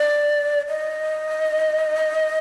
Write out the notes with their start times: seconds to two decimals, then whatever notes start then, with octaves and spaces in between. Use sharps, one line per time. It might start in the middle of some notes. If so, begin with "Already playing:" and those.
Already playing: D5
0.69 D#5